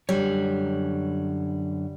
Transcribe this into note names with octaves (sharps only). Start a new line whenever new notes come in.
F#2 D3 G3 C#5